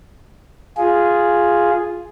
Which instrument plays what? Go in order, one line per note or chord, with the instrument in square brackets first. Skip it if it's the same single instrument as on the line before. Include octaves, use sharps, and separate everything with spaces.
[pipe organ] F4 G#4